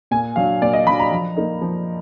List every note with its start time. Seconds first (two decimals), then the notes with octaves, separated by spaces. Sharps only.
0.11 A#2 G#5
0.36 F#3 D4 F5
0.62 A#2 D5
0.73 D#5
0.87 F#3 D4 B5
0.99 A#5
1.11 F3
1.37 A#3 D#4
1.61 F3